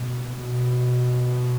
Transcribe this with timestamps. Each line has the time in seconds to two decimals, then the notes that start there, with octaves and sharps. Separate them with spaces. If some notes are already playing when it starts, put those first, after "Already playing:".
Already playing: B2
0.34 B2